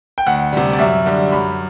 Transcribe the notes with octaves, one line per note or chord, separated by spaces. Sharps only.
G5
D2 F#5
C3 G3
D5
F#2 E5
D3 G3
F#2 B5